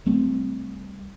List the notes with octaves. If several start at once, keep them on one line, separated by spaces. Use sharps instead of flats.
C2 G3 A3 C4